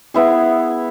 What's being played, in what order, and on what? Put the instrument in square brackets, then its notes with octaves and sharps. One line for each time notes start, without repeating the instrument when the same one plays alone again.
[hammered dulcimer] B3 E4 G#4